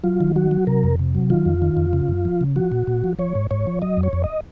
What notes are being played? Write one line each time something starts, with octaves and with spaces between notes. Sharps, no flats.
F#3 F4
D#3
F#3 F#4
F#3
C3 A#4
F2
C3
F#3
D#3 F4
F2
D#3
F2
C#3
F#2
F3
C#3
F3 F#4
A#2
A#2
F3
F3 C#5
G#2
G#2 C#5
F3
F#3 D#5
F2
C#5
F2
D#5